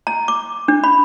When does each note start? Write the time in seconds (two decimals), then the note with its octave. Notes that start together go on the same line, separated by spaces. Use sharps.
0.07 A#5
0.28 D6
0.68 D4
0.84 B5